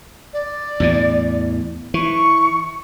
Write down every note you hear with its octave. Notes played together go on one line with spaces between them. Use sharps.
D5
E2 A2 E3
E3 C#6